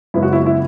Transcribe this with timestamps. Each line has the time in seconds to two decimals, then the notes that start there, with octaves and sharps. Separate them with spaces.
0.14 F#2 C#3 G#3 B3 E4
0.22 F#4
0.33 E4
0.46 E4